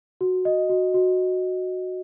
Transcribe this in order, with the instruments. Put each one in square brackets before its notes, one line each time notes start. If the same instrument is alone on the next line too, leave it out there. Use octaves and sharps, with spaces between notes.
[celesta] F#4
D#5
F#4
F#4